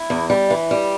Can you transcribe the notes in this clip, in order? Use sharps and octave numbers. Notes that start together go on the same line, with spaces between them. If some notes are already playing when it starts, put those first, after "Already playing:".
Already playing: E4
E2
G3
E3
G3